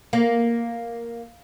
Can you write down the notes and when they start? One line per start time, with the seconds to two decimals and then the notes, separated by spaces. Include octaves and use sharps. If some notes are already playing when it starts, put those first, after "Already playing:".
0.13 A#3